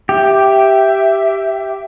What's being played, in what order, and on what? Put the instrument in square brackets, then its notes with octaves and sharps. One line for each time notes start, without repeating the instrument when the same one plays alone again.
[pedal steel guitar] G4 [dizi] E5